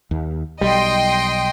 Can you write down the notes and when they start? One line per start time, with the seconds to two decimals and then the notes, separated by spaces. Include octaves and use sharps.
0.11 D#2
0.61 B1 G3 D#5 G5 C6